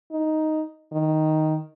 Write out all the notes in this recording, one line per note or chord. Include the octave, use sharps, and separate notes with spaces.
D#4
D#3